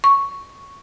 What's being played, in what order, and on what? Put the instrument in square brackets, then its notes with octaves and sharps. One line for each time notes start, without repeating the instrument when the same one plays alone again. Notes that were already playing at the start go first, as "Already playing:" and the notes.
[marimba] C#6